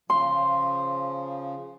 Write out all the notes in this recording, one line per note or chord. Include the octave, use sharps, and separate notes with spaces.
C#3 F3 C6